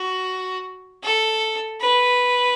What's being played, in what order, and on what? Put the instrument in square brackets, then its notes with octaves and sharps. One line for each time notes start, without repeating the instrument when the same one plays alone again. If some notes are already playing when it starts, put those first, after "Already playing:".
Already playing: [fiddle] F#4
A4
B4